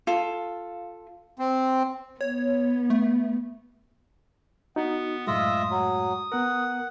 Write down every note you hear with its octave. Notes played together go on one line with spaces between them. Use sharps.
F4 A4
C4
B3 C#5
A3
B3 D#4 F#4
F#2 A2 G#3 F4 D#5 E5 D#6
F#3
B3 A#4 F#5